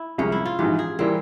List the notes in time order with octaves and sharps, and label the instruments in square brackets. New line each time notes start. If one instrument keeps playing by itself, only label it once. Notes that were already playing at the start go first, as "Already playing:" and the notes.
Already playing: [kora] E4
[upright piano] C2 C3 F3 G#3 [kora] C#4
[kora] E4
F4
[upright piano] A#1 G#2 E3 [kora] G4
[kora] G#4
[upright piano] E3 G3 A#3 [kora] C4